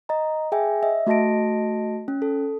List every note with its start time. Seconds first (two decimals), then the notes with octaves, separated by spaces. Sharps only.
0.09 D#5 A#5
0.52 G#4 E5 G5 G#5
0.83 D#5 E5
1.07 A3 F#4 D#5 A5 A#6 D7
2.08 C#4
2.22 A4